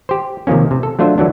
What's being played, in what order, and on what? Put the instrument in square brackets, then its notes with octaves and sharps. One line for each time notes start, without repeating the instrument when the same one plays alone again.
[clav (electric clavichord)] G4 C5
C3 D#3 F3 A#3 C#4
C3
A4
F#3 A3 D4 F4 C5 E5
D3 E3 F#3 D4